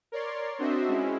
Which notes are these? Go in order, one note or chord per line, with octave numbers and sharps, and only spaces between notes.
A#4 C#5 D5 C6
C4 D4 F#4 C5 D#5 E5
G#3 C#4 E4